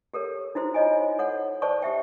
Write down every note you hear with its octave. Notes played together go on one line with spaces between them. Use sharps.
G4 A4 A#4 C#5
D#4 E4 F#4 C5
F4 C#5 D#5 G#5
A4 C#5 F#5
C5 D5 A5 C#6
G4 E5 G5